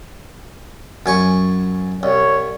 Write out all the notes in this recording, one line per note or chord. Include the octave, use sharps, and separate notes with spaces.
F#2 G#5 C#6
C2 C#5